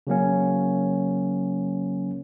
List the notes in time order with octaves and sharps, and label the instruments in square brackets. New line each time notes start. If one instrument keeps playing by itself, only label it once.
[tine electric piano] C#3 F#3 A#3 C#4